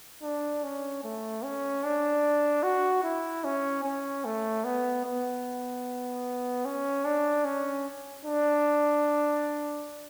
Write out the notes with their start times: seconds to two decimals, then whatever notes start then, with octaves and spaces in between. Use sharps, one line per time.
0.22 D4
0.64 C#4
1.04 A3
1.44 C#4
1.84 D4
2.63 F#4
3.03 E4
3.44 C#4
3.84 C#4
4.25 A3
4.64 B3
5.05 B3
6.65 C#4
7.05 D4
7.45 C#4
8.25 D4